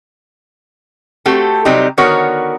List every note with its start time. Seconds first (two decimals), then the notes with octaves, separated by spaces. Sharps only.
1.26 A3 C4 F#4 G4 A4
1.65 C3 F#3 G3 C4 D#4 G4
1.97 D3 D#3 B3 F#4 A#4 C#5